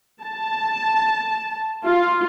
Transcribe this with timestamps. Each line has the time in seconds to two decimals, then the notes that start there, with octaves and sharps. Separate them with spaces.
0.22 A5
1.84 F4